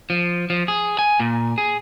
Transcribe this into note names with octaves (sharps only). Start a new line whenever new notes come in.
F3
F3
G#4
G#5
A#2
G#4